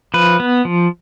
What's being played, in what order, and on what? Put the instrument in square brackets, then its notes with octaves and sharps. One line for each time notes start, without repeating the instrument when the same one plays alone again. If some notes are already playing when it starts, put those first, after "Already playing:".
[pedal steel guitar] F3 B4
B3
F3